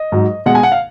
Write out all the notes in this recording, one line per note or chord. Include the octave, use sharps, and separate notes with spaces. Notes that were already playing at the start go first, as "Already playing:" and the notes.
Already playing: D#5
G#2 F#3
B2 G#3 F#5
G#5
F#5
F5